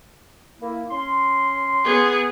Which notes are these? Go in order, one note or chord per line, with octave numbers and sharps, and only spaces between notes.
A#3 E4
C#4 C6
B3 G#4